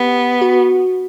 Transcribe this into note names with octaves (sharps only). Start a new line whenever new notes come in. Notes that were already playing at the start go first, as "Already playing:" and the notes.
Already playing: B3 G4
F#4